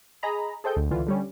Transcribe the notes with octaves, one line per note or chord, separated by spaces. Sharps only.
G#4 D#5 A#5 B5
G#4 A4 C5 D#5 G5 G6
D2
C#2 D3 E3 F4
D3 G3 C#4